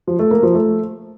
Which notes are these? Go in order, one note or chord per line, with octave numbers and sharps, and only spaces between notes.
F3
A3
A#3
F3
A3